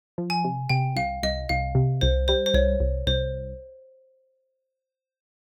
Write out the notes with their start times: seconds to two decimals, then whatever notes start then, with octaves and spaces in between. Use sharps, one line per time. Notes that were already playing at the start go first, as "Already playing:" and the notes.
0.18 F3
0.30 G#5
0.44 C3
0.69 C3 G5
0.96 C2 F5
1.23 C2 D#5
1.49 C2 F5
1.75 C3
2.01 C2 C5
2.28 G3 C5
2.46 C5
2.54 C2 C#5
2.80 C2
3.07 C2 C5